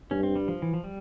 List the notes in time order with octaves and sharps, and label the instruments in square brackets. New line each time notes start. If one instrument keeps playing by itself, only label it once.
[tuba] G2 [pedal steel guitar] C#4
[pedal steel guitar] C4
G3
F3
E3
F3
G3